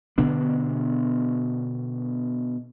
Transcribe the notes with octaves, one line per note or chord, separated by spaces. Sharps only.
B2 D3 B3 D4